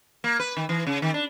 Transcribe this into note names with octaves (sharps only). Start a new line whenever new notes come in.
A#3
B4
D#3
E3
C#3
D#3
D4